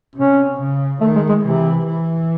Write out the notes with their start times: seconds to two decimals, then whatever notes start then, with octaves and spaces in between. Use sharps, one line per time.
0.16 C3 C#4
0.59 C#3
1.01 D#3 A3
1.16 G#3
1.29 G#3
1.44 C3 E3
1.87 E3